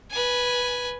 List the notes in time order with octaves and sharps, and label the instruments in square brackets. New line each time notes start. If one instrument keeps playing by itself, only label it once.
[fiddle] B4 G#5